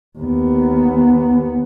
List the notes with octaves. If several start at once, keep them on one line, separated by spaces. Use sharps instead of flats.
D#2 B3